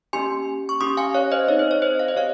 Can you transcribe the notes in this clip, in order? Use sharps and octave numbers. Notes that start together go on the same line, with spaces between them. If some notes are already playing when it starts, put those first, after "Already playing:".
A#3 C#4 G4 G#5 C6
C#6
C#4 G4 C6 D#6
F5 G#5
C#5 F5
C5 D#5
C4 D#4 G#4 C#5
C5
C#5
C5 D#5
F5
D#5
C4 G4 C#5 F5